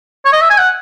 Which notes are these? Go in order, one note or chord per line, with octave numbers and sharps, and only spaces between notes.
C#5
D#5
E5
G#5
F#5